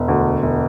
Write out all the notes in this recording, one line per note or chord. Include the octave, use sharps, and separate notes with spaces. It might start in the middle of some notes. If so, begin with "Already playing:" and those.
Already playing: E1
D2
E1